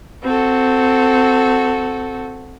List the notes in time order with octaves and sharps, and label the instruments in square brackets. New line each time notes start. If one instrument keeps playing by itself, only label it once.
[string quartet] C4 F#4 A4